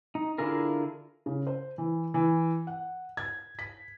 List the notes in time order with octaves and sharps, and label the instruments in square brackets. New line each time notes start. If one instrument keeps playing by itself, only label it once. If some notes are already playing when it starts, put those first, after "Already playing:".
[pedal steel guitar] D#4
D3 E4 F4 G#4 A#4
[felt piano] C#3
C5
E3
E3
F#5
G#6
B6